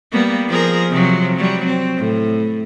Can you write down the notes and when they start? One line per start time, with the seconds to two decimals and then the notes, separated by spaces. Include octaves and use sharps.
0.12 G3 A#3 B3
0.48 F3 G#4 A#4
0.90 C3 F3 F#3
1.36 F#3 G3
1.66 C4
1.97 A2